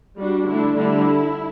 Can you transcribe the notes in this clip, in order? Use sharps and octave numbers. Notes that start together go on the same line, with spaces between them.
G3 D4 F#4
D3 A3 D4 E4
D3 G3 D4 E4